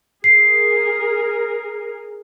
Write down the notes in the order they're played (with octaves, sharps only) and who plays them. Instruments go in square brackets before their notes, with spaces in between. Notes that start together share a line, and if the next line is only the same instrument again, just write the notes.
[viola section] G#4 A#4 [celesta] C7